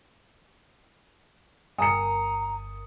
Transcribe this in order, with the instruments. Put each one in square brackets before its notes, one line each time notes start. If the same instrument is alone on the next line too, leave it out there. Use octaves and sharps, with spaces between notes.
[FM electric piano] G1 A#4 [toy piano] G5 G#5 [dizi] A#5 [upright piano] D#6 C#7